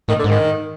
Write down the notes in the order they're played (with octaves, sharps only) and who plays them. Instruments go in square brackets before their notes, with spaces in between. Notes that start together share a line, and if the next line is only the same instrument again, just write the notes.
[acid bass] A2 [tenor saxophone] D#3
[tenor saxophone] D3
[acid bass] G#2 [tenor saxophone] D#3